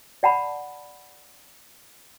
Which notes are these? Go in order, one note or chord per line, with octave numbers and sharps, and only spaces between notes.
D5 F#5 A5 B5